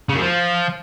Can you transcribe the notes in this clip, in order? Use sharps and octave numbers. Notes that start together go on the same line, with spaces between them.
C#3
F#2
F3